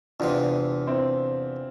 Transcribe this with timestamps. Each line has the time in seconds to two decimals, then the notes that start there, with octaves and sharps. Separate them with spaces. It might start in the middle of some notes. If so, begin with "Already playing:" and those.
0.20 E2 C3 E3 D4 F4
0.87 C4 E4